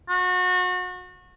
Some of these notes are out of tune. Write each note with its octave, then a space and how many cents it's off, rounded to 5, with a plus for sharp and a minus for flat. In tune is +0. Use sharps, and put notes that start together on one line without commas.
F#4 -30